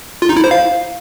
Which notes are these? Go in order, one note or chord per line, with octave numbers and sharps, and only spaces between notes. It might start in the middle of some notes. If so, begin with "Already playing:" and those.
F4
D#4
E4
C5
F5